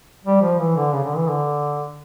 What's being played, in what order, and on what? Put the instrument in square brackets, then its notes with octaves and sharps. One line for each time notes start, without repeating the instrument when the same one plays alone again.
[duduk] G3
F3
E3
D3
C#3
D3
E3
D3